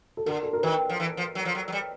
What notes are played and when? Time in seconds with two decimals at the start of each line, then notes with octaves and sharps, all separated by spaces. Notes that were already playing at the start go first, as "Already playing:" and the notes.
0.17 A4
0.26 D3 A#4
0.43 A4
0.53 A#4
0.63 D#3 B4
0.89 F3
1.00 E3
1.17 F3
1.35 F#3
1.45 F3
1.55 F#3
1.68 F#3
1.72 G3